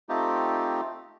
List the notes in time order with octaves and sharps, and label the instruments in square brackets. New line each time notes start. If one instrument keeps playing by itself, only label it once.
[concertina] A3 C4 D#4 F4 G4